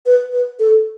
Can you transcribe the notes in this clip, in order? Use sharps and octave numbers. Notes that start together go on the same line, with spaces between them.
B4
B4
A4